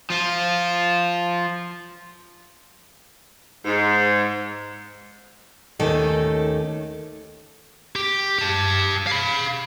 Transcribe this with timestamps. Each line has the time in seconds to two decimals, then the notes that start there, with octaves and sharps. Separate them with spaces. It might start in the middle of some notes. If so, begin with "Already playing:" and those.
0.10 F3 F4
3.65 G#2
5.79 D#2 D#3 A3 C#4 A4 D#5
7.96 G4
8.39 G4 A5
9.07 F5 B5